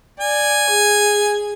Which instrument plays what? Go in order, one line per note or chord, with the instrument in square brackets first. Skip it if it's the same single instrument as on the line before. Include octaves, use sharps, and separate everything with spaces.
[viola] D5 [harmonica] G#5
[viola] G#4